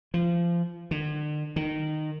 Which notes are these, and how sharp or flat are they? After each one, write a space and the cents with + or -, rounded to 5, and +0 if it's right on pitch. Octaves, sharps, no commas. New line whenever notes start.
F3 -25
D3 +40
D#3 -15